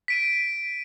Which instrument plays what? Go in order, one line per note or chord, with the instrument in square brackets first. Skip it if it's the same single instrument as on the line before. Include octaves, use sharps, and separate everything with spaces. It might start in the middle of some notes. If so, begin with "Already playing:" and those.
[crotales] B6 D7 D#7